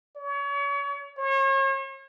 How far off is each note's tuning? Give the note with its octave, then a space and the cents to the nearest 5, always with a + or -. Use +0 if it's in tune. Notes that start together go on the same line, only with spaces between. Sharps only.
C#5 +35
C#5 -40